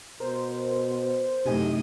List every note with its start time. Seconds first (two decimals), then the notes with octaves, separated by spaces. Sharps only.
0.20 B2 A#4 C5
1.46 F#2 A2 C3 D#4 G4 D#5 G#5